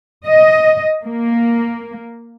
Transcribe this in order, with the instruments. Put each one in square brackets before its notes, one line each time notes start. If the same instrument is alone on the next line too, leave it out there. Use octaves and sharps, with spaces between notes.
[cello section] D#5
A#3